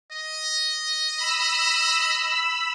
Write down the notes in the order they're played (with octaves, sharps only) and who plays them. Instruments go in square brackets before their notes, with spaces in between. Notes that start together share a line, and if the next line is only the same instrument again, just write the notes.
[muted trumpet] D#5
[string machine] B5 E6